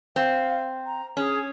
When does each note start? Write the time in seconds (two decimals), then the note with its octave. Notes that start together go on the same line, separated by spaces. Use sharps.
0.16 C4 F5
0.86 A#5
1.17 C#4 G#4